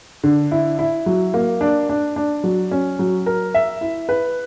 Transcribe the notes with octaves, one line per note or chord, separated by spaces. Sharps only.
D3
E4
E4
F#3
A#3
D4
D4
D4
F#3
C#4
F#3
A#4
E5
E4
B4